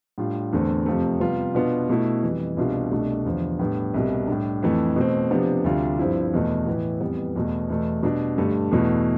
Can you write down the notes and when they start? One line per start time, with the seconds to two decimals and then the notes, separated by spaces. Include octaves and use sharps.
0.18 A2 G3 D4 F4
0.53 E2 D3 A3 C4
0.86 F2 C3 F3 A3
1.20 C3 G3 B3 F4
1.55 B2 B3 D4 F4
1.89 B2 A3 E4
2.23 F2 E3 G3
2.57 C2 B2 G3 D4 F4
2.91 C2 B2 A3 D4
3.25 E2 D3 F3
3.59 A2 G3 B3 D4
3.94 C2 B2 G3
4.27 A2 G3 D4
4.63 F2 E3 A3 E4
4.96 B2 A3 C4
5.31 C3 F3 B3 D4
5.64 D2 C3 G3 D4 F4
5.99 G2 F3 C4 E4
6.33 E2 B2 A3
6.66 A2 E3 B3 E4
7.01 F2 E3 G3 B3
7.35 E2 B2 A3
7.69 E2 B2 A3
8.03 B2 G3 D4
8.38 G2 D3 A3
8.71 E2 B2 A3 E4